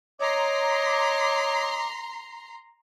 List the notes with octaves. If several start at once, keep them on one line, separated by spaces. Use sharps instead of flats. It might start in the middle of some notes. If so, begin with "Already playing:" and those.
C#5 D#5 A#5 C6 D6